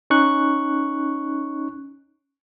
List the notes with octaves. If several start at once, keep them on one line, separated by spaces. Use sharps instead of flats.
C#4 D#4 C#6 F#6